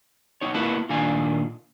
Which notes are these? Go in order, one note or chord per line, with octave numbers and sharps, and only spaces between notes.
B3 D#4 C#5
A#3 B3 E4 F4 B4 A5
A#2 D#3 D4 F4 G#5